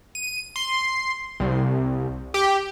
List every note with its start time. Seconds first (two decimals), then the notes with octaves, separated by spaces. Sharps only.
0.15 D#7
0.56 C6
1.40 C2
2.34 G4